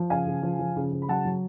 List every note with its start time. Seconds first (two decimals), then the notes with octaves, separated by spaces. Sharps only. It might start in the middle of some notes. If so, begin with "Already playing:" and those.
Already playing: F3
0.10 C#3 F5 G#5
0.26 C#3
0.43 F3
0.59 F3
0.76 C#3
0.92 C#3
1.02 B5
1.09 F#3 F#5 A5
1.25 F#3